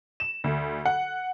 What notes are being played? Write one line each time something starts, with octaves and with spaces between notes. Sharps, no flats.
E7
D2
F#5